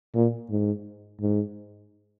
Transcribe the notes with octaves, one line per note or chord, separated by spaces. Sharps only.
A#2
G#2
G#2